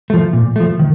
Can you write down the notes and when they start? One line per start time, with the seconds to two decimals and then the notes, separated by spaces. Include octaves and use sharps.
0.10 F3 A3
0.33 A#2
0.56 F3 A3
0.79 D#3